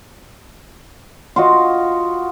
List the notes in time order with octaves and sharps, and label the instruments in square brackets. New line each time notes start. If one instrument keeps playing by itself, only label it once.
[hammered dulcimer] F4 F#4 D#5